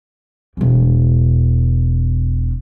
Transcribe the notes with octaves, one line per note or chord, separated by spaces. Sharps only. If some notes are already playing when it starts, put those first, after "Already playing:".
E1 E2